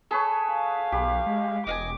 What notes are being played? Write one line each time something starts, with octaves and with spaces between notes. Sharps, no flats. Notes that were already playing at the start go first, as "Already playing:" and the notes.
G#4 A4 B4 C#5
F5
B1 G4 B5
G#3
E1 D#5 F5 G#5 D6